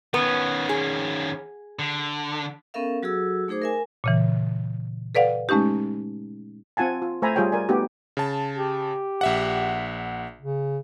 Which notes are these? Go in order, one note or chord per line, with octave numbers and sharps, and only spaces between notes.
D#3 B3 C#4 B4
G#4
D3
B3 C#4 A4 A#4 E5 F5
F#3 F#4 G#4 A4 E6
A3 D#4 G#4 C5 D6
A#4 E5 G#5
A#2 C#3 E3
A4 B4 D5 F5 F#5
G#3 A3 C#4 D#4 G4
C4 F4 F#5 G#5 A5
F4
A3 C5 E5 G#5 A#5 B5
G3 F4 G#4 C#5 G5
A#4 D5 G#5
A3 B3 D#4 F#4 G4
C#3 A5
G4
A#1 E5 F#5
C#3